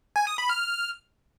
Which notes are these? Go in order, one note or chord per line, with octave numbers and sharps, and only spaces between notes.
G#5
D#6
B5
F6